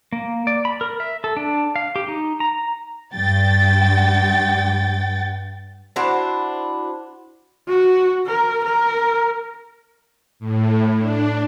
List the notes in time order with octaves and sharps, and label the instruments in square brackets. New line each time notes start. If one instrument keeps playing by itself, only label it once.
[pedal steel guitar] A#3
D5
B5
A#4
E5
A4
D4
F5
G4
D#4
A#5
[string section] G2 G5 A6
[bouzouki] D4 E4 F#4 C5
[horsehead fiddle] F#4
A#4
A#4
[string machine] A2
D4